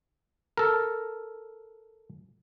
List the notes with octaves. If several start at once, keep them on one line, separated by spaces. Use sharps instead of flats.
A4 A#4